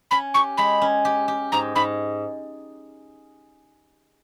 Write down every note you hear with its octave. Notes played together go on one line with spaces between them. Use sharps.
C#4 B5
G4 C#6
G#3 B5
C#4
G4
G4
G#2 A#5
G#2 B5